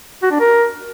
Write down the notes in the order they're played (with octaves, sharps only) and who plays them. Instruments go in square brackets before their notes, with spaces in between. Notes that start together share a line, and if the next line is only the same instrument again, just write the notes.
[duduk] F#4
D4
A#4